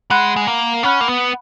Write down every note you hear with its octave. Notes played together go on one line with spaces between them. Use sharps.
G#3 F#5 B5 F#6
G#3
A#3
C#4 F#5 B5 F#6
A#3
B3